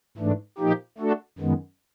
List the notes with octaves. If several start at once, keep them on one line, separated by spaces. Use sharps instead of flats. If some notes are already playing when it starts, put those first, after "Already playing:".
G#2 E3 A3 D4
A#2 F3 A#3 D#4 G4
A3 D4 F#4 A4
F#2 D#3 G#3 B3